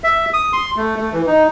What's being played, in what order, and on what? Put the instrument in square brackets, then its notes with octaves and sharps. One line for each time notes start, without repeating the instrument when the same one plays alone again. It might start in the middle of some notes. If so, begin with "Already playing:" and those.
[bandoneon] E5
D#6
C6
A3
A3
E3
D#4